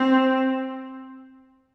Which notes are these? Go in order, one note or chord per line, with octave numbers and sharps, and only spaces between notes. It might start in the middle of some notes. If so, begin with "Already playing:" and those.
Already playing: C4